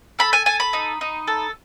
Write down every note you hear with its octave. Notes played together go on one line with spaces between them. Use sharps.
A4 B5
G#5
A4 G#5
B5
D#4
D#4
A4